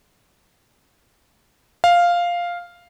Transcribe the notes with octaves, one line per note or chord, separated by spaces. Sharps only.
F5